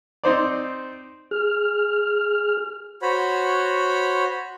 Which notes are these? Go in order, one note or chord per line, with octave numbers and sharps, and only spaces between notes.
C4 D#4 C5 D5
G#4 F6
F#4 C5 C#5 B5